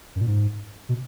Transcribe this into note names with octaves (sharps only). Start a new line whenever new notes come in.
F#2
A#2
G#2
B2